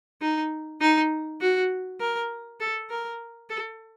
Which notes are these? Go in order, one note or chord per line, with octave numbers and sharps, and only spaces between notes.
D#4
D#4
F#4
A#4
A4
A#4
A4